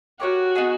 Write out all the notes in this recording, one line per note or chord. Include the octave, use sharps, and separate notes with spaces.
F#4 G4 A#4 C#5 F#5
B3 D#4 G#4